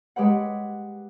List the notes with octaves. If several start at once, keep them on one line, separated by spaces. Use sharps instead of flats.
G#3 G4 B4 F#5